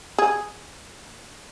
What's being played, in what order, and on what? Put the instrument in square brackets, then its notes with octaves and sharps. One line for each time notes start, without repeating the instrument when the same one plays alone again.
[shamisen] G#4